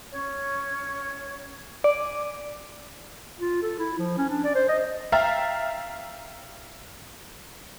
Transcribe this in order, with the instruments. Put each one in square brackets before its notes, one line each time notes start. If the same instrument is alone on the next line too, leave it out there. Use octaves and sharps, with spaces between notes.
[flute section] C#4 C#5
[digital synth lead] D5 [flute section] G#5 D6
[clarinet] F4
A4
E4
F3
C#4
D4
D5
C5
D#5
[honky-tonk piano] E5 F5 G5 A#5 F6 A6